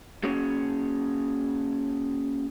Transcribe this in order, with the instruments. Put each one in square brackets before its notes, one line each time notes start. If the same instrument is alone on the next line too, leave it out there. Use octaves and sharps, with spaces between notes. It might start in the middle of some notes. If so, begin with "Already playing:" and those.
[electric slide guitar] A#3 C#4 F#4 G#4 C#5